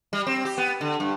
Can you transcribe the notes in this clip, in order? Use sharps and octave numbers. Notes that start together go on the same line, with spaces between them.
G3
C4
G4
B3
D3
G2